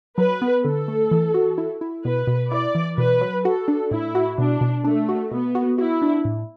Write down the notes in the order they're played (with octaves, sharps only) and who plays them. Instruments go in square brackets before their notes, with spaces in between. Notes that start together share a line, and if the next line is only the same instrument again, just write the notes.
[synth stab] F#3 [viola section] B4
[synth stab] B3
[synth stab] D3 [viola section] A4
[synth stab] A3
E3
F#4
E4
E4
[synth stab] B2 [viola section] B4
[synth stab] B2
[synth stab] E4 [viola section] D5
[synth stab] E3
[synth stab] B2 [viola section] B4
[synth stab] F#3
[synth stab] F#4 [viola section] A4
[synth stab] D4
[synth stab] A2 [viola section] E4
[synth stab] F#4
[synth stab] B2 [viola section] D4
[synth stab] B2
[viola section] A3 [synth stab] D4
[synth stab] F#4
[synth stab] B2 [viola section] B3
[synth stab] F#4
[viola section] E4 [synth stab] F#4
[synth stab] D4
A2